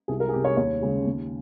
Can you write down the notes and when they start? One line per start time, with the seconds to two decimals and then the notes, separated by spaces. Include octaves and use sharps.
0.08 C2 G#4
0.20 A#4
0.29 G#4
0.33 C3 G3 G4
0.45 C#5
0.57 D#2 C#5
0.81 C#3 G#3
1.06 D#2